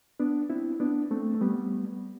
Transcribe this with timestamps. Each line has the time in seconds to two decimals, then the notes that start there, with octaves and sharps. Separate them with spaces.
0.20 B3 D4
0.50 C4 E4
0.80 B3 D4
1.11 A3 C4
1.35 A3
1.41 G3 B3